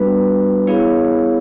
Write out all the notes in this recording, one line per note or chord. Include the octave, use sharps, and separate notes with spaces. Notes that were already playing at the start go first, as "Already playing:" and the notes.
Already playing: G3 B3 D4 F#4 B4
B3 E4 G#4 C#5 F5